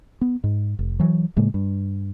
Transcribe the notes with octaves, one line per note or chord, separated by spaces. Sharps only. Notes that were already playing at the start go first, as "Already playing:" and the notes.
B3
G#2
F1
E3 F#3
A2 C#3 G#3 A#3
G2